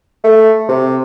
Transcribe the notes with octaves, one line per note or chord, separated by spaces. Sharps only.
A3
C3